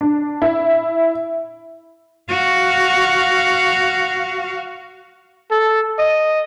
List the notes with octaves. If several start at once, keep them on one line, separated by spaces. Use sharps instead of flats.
D4
E4
F#4 F5
A4
D#5